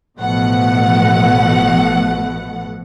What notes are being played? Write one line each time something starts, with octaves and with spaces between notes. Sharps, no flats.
A1 B2 F3 A3 F#5